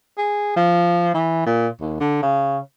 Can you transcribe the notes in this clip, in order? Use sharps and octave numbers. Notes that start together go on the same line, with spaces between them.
G#4
F3
E3
A#2
D#2
D3
C#3